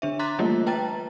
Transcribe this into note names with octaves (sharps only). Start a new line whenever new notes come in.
D3 D4 E5
A#5 C6 D6 F#6 A6 B6
E3 G3 A3 A#3 F4
B4 G5 A5 A#5 A6